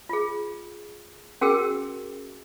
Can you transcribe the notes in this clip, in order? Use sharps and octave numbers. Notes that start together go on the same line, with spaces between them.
F4 G#4
C#4 F#4 G#4 A#4 G5 E6